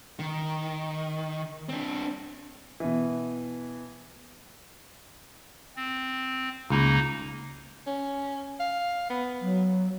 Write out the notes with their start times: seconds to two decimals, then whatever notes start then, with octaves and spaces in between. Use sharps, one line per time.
0.19 D#3
1.69 C4 D4
2.80 B2 E3
5.76 C4
6.70 C#2 A#3 D#4
7.87 C#4
8.60 F5
9.10 B3
9.41 F#3